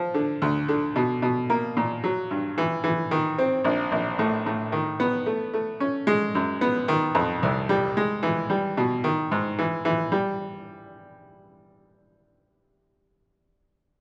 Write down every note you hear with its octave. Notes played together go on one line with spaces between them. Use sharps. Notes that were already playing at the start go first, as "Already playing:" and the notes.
Already playing: F3
D3
D2
D3
B2
B2
A#3
A#2
F#3
G2
E3
E3
D#3
C4
A#1
A#1
A2
A2
D#3
B3
A3
A3
C#4
G#3
F#2
B3
D#3
F2
C2
G3
G#3
E3
G3
B2
D#3
G#2
E3
E3
G3